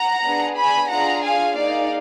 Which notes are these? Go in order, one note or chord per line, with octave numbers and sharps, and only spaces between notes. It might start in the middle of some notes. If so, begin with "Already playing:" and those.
Already playing: F#5 A#5
B3 D4 G#4
G#5 B5
D4 F4 G#4 F#5 A#5
F5 G#5
A#3 D#4 G#4 D5 F5